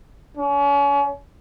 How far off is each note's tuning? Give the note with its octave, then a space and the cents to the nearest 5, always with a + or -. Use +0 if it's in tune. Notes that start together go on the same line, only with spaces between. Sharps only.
C#4 +35